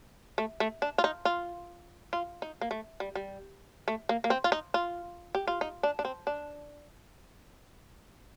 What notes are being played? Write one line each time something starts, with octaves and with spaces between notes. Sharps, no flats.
A3
A3
D4
F4
D#4
F4
F4
D#4
A#3
A3
G3
G3
A3
A#3
A#3
C4
F4
D#4
F4
G4
F4
D#4
D4
D4
C4
D4